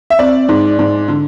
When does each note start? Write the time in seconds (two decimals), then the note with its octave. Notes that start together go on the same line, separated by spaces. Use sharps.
0.10 E5
0.19 C4 D5
0.49 G#2
0.79 G#2
1.08 D3